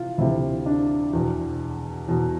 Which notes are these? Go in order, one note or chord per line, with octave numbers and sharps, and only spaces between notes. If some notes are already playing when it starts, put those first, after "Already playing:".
Already playing: C3 E3 F4
D2 C3 E3 E4
D4
E2 B2
E2 B2